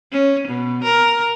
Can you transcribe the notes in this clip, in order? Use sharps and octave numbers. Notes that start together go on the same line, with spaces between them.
C#4
B2
A#4